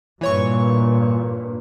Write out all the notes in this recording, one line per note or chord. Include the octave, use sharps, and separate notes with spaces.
G2 A#2 E3 C#5 C#6